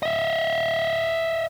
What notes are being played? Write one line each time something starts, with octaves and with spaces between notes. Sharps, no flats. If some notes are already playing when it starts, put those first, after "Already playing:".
D#5 E5